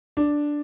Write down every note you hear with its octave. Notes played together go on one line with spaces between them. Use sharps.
D4